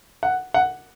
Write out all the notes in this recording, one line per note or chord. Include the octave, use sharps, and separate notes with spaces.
F#5
F#5